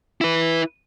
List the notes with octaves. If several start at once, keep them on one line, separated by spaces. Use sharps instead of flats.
E4 B4